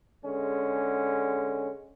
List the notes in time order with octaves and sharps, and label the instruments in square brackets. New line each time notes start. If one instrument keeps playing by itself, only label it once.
[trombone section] D3 G#3 C#4